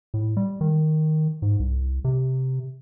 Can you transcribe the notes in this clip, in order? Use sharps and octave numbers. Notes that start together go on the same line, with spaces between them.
A2
G3
D#3
G#2
C2
C3